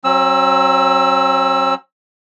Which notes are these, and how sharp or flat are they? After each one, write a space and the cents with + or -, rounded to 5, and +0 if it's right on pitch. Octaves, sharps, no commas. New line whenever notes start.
F#3 +0 C4 +45 E6 +0